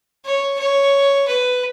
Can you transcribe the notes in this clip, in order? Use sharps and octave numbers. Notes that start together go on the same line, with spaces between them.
C#5
C#5
B4